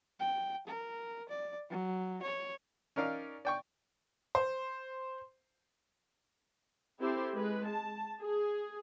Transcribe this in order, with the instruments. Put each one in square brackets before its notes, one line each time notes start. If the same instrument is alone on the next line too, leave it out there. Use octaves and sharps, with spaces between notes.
[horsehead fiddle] G5
A#4
D5
F#3
C#5
[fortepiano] C#4 D#4 A#4 D5 F5
D5 G5 C#6
[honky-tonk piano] C5
[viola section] C4 E4 G4 A4 C5
G#3 B4
A5
G#4